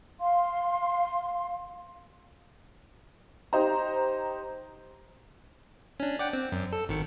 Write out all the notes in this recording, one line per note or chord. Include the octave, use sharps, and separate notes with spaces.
F5 C6
D#4 G4 C5 A#5
C#4 D4
D5 F#5 G5
C4
F#2
A4
G#1 D#3 C#7